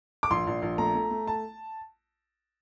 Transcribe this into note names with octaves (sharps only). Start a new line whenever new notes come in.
D6
A#1 C6
A#1
A#1
A3 A#5
A3
A3
A5